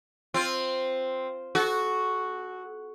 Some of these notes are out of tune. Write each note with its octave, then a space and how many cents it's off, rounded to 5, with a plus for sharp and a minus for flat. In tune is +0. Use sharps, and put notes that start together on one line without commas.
C4 +0 F4 +0
F#4 +0 A4 -35